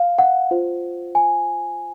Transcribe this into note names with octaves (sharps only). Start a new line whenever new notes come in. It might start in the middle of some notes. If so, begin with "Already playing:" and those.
Already playing: F5
F#5
F4 C5
G#5